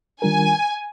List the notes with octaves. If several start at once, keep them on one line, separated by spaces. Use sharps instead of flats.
D#3 G3 D4 F4 A#4 G#5